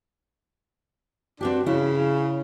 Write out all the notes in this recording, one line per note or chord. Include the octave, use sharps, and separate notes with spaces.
G2 C4 D4 F#4 G4
C#3 E4